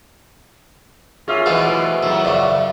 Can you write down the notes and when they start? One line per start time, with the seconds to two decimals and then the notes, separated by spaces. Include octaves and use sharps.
1.28 F#3 A#3 C#4 F4 G#4 E5 E6
1.46 B2 E3 F#3 G#3 A3 F4 C5
2.03 F3 F#3 E4
2.25 F#2 C#3 D5 E5 C#6